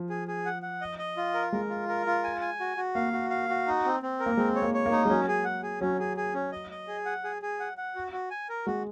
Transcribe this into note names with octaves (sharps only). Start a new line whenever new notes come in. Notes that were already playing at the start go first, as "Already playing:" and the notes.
Already playing: F3
G#4
G#4
F#5
F#5
D#5
D#5
F4
A#4
G#3 A#4
F4
A#4
F4
G#5
G#5
F#4
F#4
A#3 F5
F#4
F5
F#4
D#4
C4
C4
A#4
A#3
G#3 C4
C#5
A#3
C#5
A#3
D#4
G#3
F#3 C#4
G#4
F#5
G#4
F#3 C#4
G#4
G#4
C#4
D#5
D#5
G#4
F#5
G#4
G#4
F#5
F#5
F#4
F#4
G#5
A#4
G#3 F#4